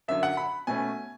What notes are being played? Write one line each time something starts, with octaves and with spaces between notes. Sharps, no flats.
F#2 D3 F#3 E5
F#5
B5
B2 A3 C#4 G#5